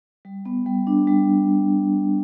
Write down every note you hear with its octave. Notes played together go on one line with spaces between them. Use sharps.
G3
B3
G3
D4
G3